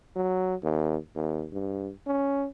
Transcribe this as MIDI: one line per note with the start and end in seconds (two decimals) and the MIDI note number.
0.16 0.55 54
0.63 0.97 39
1.15 1.46 39
1.53 1.91 43
2.07 2.46 61